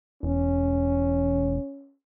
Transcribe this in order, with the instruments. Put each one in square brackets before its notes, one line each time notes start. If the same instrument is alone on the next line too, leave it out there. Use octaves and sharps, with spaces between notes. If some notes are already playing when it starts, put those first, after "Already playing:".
[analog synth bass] E1 [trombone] C#4